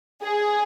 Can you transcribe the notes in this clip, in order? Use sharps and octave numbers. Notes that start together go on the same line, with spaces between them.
G#4